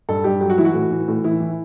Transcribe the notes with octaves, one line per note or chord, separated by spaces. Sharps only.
G2 A4
G2 G4
F#3 G4
F#4
E3 E4
F#4
A2
E3
A2
E3 E4
E3